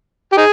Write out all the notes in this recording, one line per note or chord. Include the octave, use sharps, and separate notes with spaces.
G4
D#4 G#4